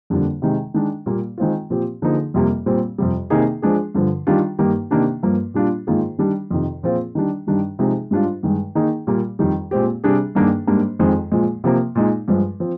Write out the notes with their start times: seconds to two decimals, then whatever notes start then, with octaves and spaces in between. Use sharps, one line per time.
0.10 F2 D3 G3 A#3 D4
0.42 C3 D#3 G#3
0.74 D#3 G#3 D4
1.06 A#2 G3 A#3
1.38 D#3 G#3 C4 F4
1.70 A#2 F3 C4 G4
2.02 D3 F3 A#3 D#4 G#4
2.34 F2 C3 G3 A#3
2.66 A#2 G3 C4
2.98 F2 C3 G3
3.30 C3 D#3 A#3 D#4 G#4
3.62 F3 G#3 D4 G#4
3.95 G2 D3 F3
4.27 D#3 G3 D4 F4
4.59 G2 D#3 A#3 D#4 G4
4.91 C3 D#3 A#3 D4 G4
5.23 G2 F3 A#3
5.54 A#2 G3 D4 F4
5.87 G#2 D#3 A#3 F4 G#4
6.18 D#3 G3 D4
6.51 F2 C3 D#3
6.83 A#2 F3 C4 F4 G#4
7.15 D#3 G3 D4
7.47 G2 D#3 G3 D4
7.79 C3 F3 G#3 D#4 G#4
8.11 G#2 G3 D4 F4
8.43 G2 D#3 G#3
8.75 D#3 A#3 D#4 G#4
9.07 A#2 G3 A#3
9.39 F2 D#3 G3
9.71 A#2 G#3 C4 G4
10.04 C3 G3 D4 G#4
10.35 G2 D#3 A#3 D4 G#4
10.67 G#2 G3 A#3 D4
10.99 F2 D#3 G#3 C4
11.32 A#2 F3 G#3
11.64 C3 F3 A#3
11.95 A#2 G#3 D#4
12.28 G2 F3 G#3
12.60 F3 C4